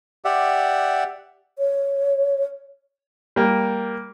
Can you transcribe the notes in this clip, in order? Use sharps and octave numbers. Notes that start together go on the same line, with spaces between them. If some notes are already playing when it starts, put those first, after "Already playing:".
G4 D5 E5 F#5
C#5
G3 A#3